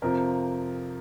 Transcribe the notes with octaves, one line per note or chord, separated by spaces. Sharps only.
F2 C3 F3 A#4